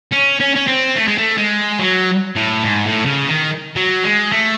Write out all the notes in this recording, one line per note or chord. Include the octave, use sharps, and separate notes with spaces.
C#4
C#4
C#4
C4
A3
G#3
A3
G#3
F#3
A2
G#2
A2
C#3
D#3
F#3
G#3
A3